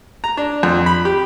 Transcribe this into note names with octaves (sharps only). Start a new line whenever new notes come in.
A#5
D4
F2
B5
G4